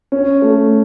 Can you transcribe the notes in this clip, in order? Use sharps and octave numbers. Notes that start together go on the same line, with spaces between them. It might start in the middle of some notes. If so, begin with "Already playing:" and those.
C#4
A3